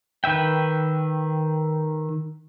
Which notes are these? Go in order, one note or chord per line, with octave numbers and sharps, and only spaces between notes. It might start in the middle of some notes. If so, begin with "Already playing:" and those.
D#3 B4 E5 G5